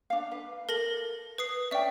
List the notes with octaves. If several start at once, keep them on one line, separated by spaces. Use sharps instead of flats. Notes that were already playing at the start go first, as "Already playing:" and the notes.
D4 F5
B4
A4 A#4 A#6 F#7
B4 D#6 C7
C#4 D4 D5 E5 G5